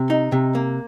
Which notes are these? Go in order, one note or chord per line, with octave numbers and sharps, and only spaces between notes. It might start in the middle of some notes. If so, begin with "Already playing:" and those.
Already playing: C3
D#4
C3
A#3